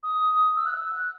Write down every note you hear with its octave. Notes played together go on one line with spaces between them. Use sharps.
D#6
E6
F#6
E6
F#6